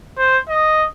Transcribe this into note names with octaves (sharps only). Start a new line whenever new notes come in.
C5
D#5